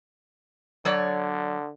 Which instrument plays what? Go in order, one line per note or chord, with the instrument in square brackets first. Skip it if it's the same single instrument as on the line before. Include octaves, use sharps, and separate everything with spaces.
[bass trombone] D3 [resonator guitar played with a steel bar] F#3 C#5 D5